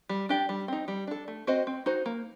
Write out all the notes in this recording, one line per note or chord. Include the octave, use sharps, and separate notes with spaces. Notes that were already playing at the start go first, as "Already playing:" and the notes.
G3
D4 G4 D5
G3
C4 D#4
G3
D4 A4
A3
C4 F#4 C5 D#5
C4
D#4 F#4 C5
A#3